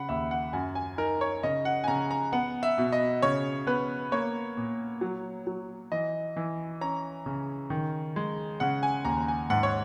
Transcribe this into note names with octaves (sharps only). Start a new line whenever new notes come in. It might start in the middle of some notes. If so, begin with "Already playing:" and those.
Already playing: C#3 F#5 B5
D#2 E5
F#5
F#2 G#5
G#5
D#4 A#4
C#5
C#3 D#5
F#5
G#5
C#3 A#5
A#5
B3 F#5
E5
B2
D#5
C#3 C#5
B3 B4
A#3 C#5
A#2
F#3
F#3
E3 D#5
E3
C#4 A#5
C#3
D#3
G#3
C#3 F#5
G#5
D#2 A#5
G#5
G#2 F#5
C#5